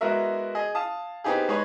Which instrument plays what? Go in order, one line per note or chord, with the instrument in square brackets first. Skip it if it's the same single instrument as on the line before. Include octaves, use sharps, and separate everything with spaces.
[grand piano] G#3 B3 E4 F#4 A#4 E5
G#4 D#5
F5 A5 D#6
B3 C4 D#4 G4 G#4
G#3 D#4 B4 C#5